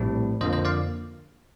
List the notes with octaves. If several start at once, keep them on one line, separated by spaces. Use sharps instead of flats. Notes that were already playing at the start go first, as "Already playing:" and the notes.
Already playing: A#1 A2 G3 C4
F2 D3 F3 A#3 C5 D#5
C5 D#5
D5 F5